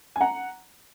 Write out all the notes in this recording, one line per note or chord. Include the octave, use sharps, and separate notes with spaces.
G#5
F#5 A#5